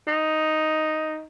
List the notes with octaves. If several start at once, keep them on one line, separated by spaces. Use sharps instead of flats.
D#4